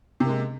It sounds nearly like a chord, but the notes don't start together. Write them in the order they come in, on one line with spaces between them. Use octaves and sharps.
C3 A#3 G#3